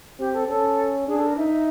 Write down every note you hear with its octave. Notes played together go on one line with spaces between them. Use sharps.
C4 G4
A4
C#4 A4
D4 G#4
A4
A#4
D#4 E5